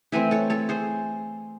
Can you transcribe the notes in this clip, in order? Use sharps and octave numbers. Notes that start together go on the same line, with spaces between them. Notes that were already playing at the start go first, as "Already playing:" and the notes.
E3 A3 C4 E5 G#5
A4 C#5
A4 C#5
G#4 C5